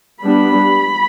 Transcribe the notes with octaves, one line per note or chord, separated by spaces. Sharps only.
G3 B3 D4 B5